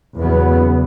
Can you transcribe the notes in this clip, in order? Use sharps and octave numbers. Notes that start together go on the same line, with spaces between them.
E2 C#3 F#3 B3